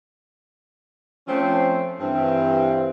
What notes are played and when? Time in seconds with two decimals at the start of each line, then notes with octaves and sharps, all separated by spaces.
1.28 F3 A3 C4 C#4
2.00 G2 E3 C4